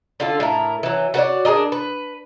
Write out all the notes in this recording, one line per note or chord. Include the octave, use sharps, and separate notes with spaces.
D3 F4 A4
A2 E4 A#4
E3 F#3
F#4 B4 C#5 D5
D4 G#4 A#4 D#5
B4